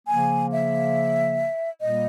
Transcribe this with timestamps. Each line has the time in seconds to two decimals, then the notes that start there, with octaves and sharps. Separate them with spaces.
0.06 C#3 F3 A#3 G#5
0.51 E5
1.81 A#2 G3 A#3 D#5